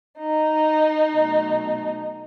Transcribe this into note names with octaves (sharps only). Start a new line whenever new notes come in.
D#4
B2 F#3 A3